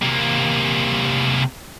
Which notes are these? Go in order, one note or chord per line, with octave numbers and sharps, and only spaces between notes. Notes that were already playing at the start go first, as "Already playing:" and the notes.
C3 A#3